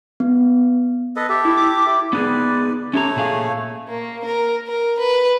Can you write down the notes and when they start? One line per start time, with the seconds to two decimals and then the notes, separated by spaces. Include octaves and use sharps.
0.20 B3
1.16 A4 B4 D#5
1.29 G4 A4 E5
1.45 E4
1.57 D6
1.87 E4 G4
2.13 B3 D#4 G#4 B4 D5
2.93 A3 C#4 G4 C#5 A#5
3.16 A#2 G#4 F5
3.89 A#3
4.25 A#4
4.68 A#4
4.99 B4